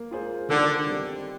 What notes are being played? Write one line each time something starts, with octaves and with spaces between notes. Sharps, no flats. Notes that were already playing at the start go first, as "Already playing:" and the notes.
Already playing: A#3
F4 G#4 C5
D3 D#3
G3 C4